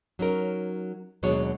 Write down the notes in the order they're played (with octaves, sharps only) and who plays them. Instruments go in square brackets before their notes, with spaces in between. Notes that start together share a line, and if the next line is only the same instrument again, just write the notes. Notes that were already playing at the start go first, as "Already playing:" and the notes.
[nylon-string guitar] F#3 C#4 D#4 A#4
D#2 B2 F#3 G#3 D4 C#5